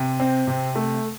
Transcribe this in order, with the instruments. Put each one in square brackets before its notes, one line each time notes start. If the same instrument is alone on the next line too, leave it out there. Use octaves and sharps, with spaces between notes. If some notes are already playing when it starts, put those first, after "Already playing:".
Already playing: [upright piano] C3
C4
C3
A3